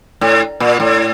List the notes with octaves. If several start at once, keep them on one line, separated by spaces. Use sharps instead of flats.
A2
A#2
A2